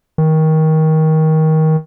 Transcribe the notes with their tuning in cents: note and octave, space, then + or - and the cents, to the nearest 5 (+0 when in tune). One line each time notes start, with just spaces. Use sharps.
D#3 +20